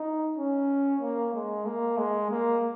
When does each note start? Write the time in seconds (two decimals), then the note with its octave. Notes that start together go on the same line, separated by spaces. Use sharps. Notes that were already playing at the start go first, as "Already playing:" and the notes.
Already playing: D#4
0.38 C#4
1.01 A#3
1.34 G#3
1.65 A#3
1.97 G#3
2.30 A#3